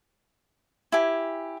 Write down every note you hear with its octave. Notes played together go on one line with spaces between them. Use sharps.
E4 G4 G#5